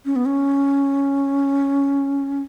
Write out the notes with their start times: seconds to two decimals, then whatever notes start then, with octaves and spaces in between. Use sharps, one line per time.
0.05 C#4
0.16 B3
0.25 C#4